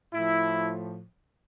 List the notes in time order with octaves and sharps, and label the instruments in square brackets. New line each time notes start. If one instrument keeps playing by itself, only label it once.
[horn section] A2 F3 E4